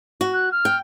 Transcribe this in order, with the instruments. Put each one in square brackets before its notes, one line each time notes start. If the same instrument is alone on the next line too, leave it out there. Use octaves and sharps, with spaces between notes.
[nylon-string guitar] F#4
[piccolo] F#6
F6
[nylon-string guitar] G5